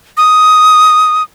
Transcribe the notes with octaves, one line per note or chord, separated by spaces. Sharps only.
D#6